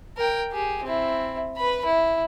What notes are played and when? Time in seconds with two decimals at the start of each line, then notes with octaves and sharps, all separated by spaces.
0.17 A#4 G5
0.52 G4 G#4
0.84 C4 E4
1.56 B4 B5
1.85 E4